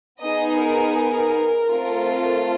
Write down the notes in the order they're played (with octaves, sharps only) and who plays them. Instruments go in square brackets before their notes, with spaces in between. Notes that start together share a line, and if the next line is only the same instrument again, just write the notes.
[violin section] B3 D#4 G#4 D#5
A#4
A#4
A3 C4 F4 A4